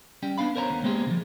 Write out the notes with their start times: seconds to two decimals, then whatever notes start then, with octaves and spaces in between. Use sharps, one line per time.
0.23 G3 C#4 G5
0.38 B3 D4 F5 B5
0.56 A#4 C5 C#5 A5 A#5
0.70 D#2 B3
0.84 G#3 A#3 C4 G4 G#4
1.07 C#3 F3